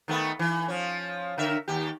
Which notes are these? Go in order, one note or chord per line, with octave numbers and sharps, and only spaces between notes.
D#3 A3 B3
E3
F3 C#4
D3 A#4 E5
D#2 G4